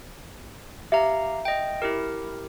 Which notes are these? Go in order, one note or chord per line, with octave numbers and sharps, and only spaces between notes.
G4 E5 F5 A#5
D#5 G5
E4 G4 A#4